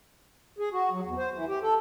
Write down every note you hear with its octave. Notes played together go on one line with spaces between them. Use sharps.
G#4
F#4
F#3
E2
C5
E3
G4
A4